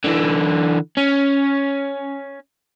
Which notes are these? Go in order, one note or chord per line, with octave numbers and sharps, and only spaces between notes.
D3 E3
C#4